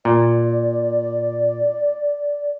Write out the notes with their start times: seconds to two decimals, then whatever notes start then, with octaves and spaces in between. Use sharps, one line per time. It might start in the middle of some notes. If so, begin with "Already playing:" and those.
0.05 A#2 D5